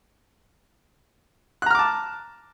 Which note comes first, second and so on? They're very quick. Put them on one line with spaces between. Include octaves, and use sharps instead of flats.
F#6 A#5 F6 D6 A5